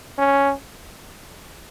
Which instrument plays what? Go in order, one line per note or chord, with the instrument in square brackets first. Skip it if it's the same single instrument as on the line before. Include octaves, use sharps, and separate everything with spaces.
[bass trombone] C#4